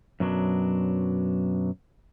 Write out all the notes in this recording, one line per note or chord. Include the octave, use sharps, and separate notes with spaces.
F#2 B2 F#3 D4